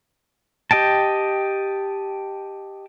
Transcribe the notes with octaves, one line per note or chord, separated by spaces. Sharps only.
G4 D#5 G5 A5